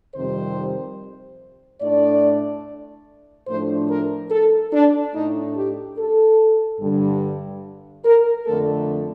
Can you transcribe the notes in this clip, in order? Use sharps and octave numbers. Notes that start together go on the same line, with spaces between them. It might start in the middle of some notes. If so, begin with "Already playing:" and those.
F2 C3 D#3 G3 C4 C5
A2 A3 D4 D5
A2 F3 A3 D4 C5
A#4
A4
D4
A2 A3 D4 D#4
G4
A4
G2 D3 G3
A#4
F2 D3 A3 A4